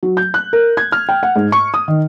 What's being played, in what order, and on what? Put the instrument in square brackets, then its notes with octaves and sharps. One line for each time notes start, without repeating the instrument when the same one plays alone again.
[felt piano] F#3
G6
F#6
A#4
G#6
F6
G5
F#5
G#2
C#6
D#6
D#3